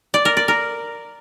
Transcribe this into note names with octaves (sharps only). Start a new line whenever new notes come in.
D5
A#4
D5
A#4